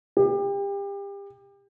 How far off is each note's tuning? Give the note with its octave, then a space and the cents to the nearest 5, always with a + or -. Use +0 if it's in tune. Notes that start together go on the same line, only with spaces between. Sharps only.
G4 +30